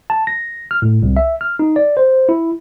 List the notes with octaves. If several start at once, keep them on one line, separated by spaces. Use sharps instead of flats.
A5
A#6
F6
A2
C2
E5
F6
D#4
D5
C5
E4